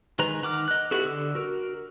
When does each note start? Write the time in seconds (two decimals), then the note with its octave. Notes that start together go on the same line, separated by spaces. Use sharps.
0.19 D#3 G#3 B4 A#5
0.42 D#3 F#5 D6 F6
0.68 D#5 F#6
0.91 B3 E4 F#4 G4 A4
1.05 D3 E6
1.35 F#4 A#4